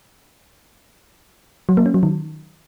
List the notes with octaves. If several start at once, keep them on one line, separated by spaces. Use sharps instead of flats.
F#3
A#3
C#4
F#3
D#3